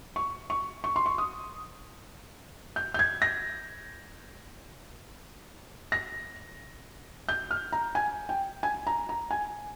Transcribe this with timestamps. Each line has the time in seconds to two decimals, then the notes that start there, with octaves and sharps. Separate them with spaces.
0.16 C#6
0.50 C#6
0.84 C#6
0.96 C6
1.06 C#6
1.18 D#6
2.76 G6
2.94 G6
2.99 G#6
3.22 A#6
5.92 A#6
7.29 G6
7.51 F6
7.72 A#5
7.95 G#5
8.29 G5
8.63 G#5
8.87 A#5
9.09 A#5
9.31 G#5